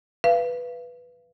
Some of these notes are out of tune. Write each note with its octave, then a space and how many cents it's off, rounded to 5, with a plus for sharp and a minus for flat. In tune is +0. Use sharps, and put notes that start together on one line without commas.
B4 +0 F5 -30